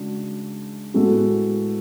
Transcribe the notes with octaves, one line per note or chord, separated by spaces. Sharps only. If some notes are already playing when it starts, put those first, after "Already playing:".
Already playing: C#3 G#3 D4 F#4
A2 G#3 B3 F#4 A4